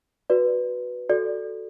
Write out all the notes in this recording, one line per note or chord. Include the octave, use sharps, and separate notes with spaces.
F#4 B4 D5
F#4 A4 D5